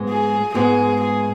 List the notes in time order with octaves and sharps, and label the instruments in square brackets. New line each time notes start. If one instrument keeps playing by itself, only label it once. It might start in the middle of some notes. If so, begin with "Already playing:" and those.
Already playing: [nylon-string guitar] G#2 G#3 B3
[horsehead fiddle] G#4
[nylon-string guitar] G#2 G#3 B3 [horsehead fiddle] G#4
[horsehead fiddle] G#4